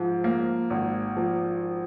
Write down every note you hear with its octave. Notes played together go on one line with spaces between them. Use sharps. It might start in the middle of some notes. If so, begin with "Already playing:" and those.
Already playing: G#2 F3
A#3
G#1
F3